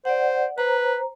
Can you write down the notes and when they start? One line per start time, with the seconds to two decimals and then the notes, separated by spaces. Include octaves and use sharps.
0.05 C5 D5 F#5
0.58 B4 C5 A#5